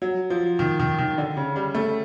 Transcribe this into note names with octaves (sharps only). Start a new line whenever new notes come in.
F#3
F3
D#3
D#3
D#3
D3
C#3
G3
A3